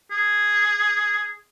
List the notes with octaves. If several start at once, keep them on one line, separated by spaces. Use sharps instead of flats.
G#4